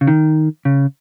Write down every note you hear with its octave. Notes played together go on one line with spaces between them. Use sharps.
C#3
D#3
C#3